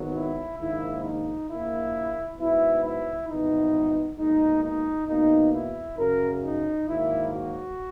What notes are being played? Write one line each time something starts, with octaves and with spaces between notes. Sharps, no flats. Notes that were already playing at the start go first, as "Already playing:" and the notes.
Already playing: G#1 G#2 D#3 F#3 B3
E4
A#1 G#2 D#3 A#3 E4
D#4
A#1 A#2 A#3 E4
G#2 F#3 B3 E4
E4
G#1 G#2 E3 B3 D#4
B1 A#2 G#3 D#4
D#4
E2 B2 A#3 D#4
E4
F#2 C#3 F#3 A#4
D#4
G#2 D#3 F#3 A#3 E4
F#4